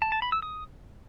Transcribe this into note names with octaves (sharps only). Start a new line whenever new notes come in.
A5
A5
B5
E6
D#6